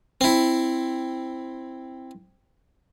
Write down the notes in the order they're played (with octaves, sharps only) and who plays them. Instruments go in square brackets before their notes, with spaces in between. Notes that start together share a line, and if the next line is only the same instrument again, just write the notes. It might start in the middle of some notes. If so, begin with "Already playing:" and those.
[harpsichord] C4 E4